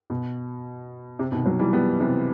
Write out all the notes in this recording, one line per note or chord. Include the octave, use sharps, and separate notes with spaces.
B2
C3
B2 D#3
D#3 F#3
E3 G3
G3 B3
C3 E3